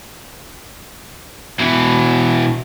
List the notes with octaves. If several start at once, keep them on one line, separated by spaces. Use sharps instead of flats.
B2 E3